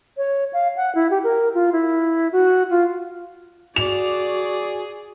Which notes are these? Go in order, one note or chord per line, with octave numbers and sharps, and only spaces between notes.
C#5
F5
F#5
E4
G4
A#4
F4
E4
F#4
F4
F#4 G#4 D5 F7